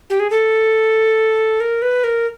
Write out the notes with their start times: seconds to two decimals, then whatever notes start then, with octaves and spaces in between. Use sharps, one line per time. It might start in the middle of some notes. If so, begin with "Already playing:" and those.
0.10 G4
0.20 G#4
0.30 A4
1.60 A#4
1.82 B4
2.04 A#4